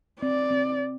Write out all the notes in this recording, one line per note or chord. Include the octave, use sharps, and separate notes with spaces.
C4 D5
C4